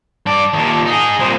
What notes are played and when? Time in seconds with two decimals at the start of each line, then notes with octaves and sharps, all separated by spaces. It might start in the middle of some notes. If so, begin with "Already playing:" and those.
0.26 G2 D5 A5
0.53 D#2 A#2
0.86 D#4 G#4
1.19 C2 A#2 C5